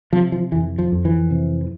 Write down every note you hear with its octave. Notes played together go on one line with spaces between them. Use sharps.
C3 F3
F3
F2 E3
F3
F2
E3
C3